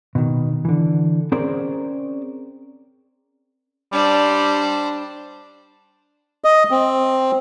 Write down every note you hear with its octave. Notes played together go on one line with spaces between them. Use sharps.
B2 D#3
D3 E3
C4 C#4 G#4 A#4 C5 D5
G3 D4 C5
D#5
C4